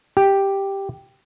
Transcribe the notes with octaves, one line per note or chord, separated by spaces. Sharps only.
G4